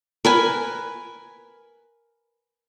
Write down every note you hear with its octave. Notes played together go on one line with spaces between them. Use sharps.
A#4 B4 G#5